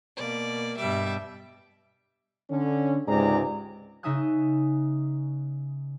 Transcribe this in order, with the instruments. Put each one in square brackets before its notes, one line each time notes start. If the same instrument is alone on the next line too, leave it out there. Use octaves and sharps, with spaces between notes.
[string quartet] B2 A#3 D5
G2 B2 G3 E5 D6
[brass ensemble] D3 C#4
C#2 G#2 C3 G#4 D5 A#5
[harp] C#3 D#4 E5 G#5 D#6 F#6